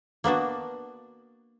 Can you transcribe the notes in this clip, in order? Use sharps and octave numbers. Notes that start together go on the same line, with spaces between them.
A#3 B3 D4 F#4